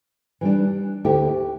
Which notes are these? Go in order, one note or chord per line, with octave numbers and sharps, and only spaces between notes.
E3 G3 D4
D2 D3 A3 E4 G4